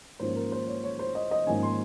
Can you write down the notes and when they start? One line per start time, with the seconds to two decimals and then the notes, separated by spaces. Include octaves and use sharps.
0.20 G#2 F3 A#3 C#4 C5
0.36 A#4
0.52 C5
0.68 C#5
0.83 C#5
0.99 C5
1.15 D#5
1.31 D#5
1.47 G#2 F3 A#3 C#4 G#5
1.63 C6